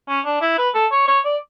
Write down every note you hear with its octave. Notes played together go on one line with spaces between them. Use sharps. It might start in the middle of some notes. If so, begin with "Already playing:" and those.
C#4
D4
E4
B4
A4
C#5
C#5
D5